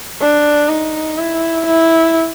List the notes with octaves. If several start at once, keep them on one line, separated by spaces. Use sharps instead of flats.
D4
D#4
E4
E4